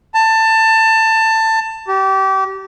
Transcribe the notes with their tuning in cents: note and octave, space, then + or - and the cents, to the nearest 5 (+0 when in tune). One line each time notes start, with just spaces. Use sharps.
A5 +20
G4 -30